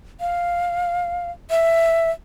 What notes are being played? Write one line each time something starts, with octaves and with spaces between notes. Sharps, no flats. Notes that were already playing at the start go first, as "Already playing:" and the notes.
F5
E5